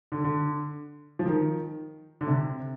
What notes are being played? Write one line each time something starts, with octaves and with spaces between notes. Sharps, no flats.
D3
D3
F3
D#3
D3
C3